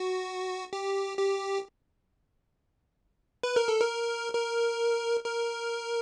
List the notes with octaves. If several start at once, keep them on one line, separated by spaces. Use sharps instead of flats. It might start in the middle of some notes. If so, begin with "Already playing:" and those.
Already playing: F#4
G4
G4
B4
A#4
A4
A#4
A#4
A#4